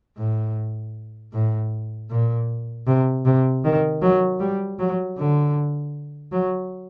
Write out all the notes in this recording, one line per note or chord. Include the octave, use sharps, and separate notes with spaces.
A2
A2
A#2
C3
C3
D#3
F#3
G3
F#3
D3
F#3